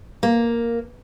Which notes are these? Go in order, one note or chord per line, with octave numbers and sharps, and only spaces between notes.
A#3